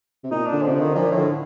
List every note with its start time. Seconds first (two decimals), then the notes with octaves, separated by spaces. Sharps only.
0.24 C3
0.31 A#2 D#4
0.47 D4
0.53 D3
0.62 F3
0.67 C3
0.73 D3
0.80 D#3
0.95 A#2 F3
1.11 A2
1.17 D3